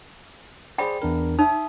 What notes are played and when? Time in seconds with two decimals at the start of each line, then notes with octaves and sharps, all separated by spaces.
0.78 G#4 C5 D5 G5 B5
1.02 E2 D4 A#4
1.39 D#4 E5 D#6